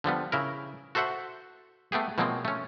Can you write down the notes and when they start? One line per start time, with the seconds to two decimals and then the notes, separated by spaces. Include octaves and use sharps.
0.04 D3 F3 G3 B3
0.32 C#3 E4 A#4
0.95 F#4 A4 C5 E5 F#5
1.92 A3 B3 G4 G#4
2.18 B2 F3 F#3 G#3 A#3 C4
2.45 A3 C#4